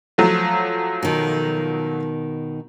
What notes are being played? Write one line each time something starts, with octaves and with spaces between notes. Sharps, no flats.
F3 F#3 A3
B2 D#3